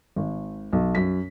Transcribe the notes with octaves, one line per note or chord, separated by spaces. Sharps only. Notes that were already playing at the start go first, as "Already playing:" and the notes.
G#1
B1
F#2 B6